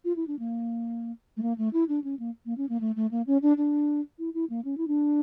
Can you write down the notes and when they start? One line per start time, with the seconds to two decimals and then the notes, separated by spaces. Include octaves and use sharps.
0.05 F4
0.16 E4
0.27 D4
0.39 A#3
1.37 A3
1.42 A#3
1.58 A3
1.73 E4
1.89 D4
2.04 C#4
2.19 A#3
2.46 A#3
2.57 C#4
2.69 A#3
2.81 A3
2.96 A3
3.11 A#3
3.27 C#4
3.42 D4
3.57 D4
4.19 E4
4.34 E4
4.50 A#3
4.65 C#4
4.78 E4
4.88 D4